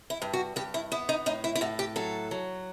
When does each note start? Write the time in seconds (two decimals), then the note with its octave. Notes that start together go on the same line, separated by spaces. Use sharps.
0.10 E4
0.22 G2
0.33 F#4
0.56 G2 G4
0.74 E4
0.92 B3 E4
1.09 D#4
1.26 A2 D#4
1.44 E4
1.55 E4
1.61 A2 F#4
1.79 G4
1.96 F#3 A4
2.31 F#3